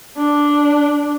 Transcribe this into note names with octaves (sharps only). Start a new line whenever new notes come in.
D4